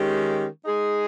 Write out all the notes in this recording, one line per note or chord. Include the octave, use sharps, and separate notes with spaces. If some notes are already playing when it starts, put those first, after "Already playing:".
Already playing: D#3 G#3 C#4 G4
G#3 D#4 G#4